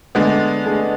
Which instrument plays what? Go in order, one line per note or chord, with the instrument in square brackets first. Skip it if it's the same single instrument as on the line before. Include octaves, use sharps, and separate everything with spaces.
[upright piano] D3 A3 D4 G#4 [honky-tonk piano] G#3 B3
[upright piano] D3 A3 D4 G#4